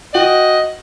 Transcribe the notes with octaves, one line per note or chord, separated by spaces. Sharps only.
F#4 D#5 G5 F#7